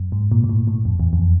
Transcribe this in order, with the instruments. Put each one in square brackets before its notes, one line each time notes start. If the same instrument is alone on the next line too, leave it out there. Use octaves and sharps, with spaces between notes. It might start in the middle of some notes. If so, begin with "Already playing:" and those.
Already playing: [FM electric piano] F#2
G#2
A#2
A#2
A2
A2
F2
E2
F2